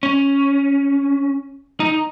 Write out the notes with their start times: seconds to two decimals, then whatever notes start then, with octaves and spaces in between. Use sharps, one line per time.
0.03 C#4
1.80 D#4